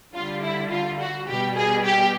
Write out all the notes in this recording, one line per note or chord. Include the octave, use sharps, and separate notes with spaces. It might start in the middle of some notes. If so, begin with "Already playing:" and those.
D3 G3 F4
E4
F4
F#4
B2 G3 G4
G#4
G4